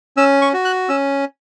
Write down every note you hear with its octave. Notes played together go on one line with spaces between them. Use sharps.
C#4 E6
C#6
F#4
F#6
C#4 E6